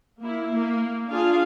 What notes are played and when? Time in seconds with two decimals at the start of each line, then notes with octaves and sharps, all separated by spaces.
0.20 A#3 E4
0.51 A#3
1.09 D4 F4 G#4 F5